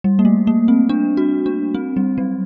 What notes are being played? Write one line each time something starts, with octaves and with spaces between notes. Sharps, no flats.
G3
A#3
A3
A#3
C4
D4
F#4
D4
C4
G3
F#3